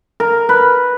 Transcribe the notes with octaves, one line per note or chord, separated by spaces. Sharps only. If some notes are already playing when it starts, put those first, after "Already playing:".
A#4
B4